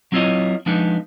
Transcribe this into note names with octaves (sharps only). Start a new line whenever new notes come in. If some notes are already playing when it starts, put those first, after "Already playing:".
F#3 C4 E4 F4 C#5 D#5
F3 G#3 B3 D4 D#4